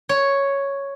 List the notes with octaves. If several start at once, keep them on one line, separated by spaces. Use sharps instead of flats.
C#5